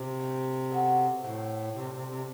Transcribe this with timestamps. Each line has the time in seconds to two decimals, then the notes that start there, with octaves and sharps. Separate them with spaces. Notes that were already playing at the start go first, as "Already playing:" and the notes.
Already playing: C3
0.19 A2 G3 D4 G4
0.71 F#3 B3 F#4 A4
1.22 A2 F#3 C4 E4 A4
1.74 A2 C3 G3 D4
1.92 C3
2.08 C3